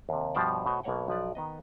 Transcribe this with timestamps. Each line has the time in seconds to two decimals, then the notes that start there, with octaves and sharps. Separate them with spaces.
0.09 D#2 C3
0.35 G2 B2 F3 G4 C5 D5
0.66 B2 A3 B3 C5 C#5 D#5
0.83 B1 B2 A#3 C#5 F#5 G5
1.08 B1 F3 B4 D5
1.35 D#3 B3 D#5